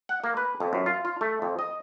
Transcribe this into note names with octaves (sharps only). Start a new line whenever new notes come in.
F#5
A#3
B4
F2
F#2
F4
F4
A3
F2
D#5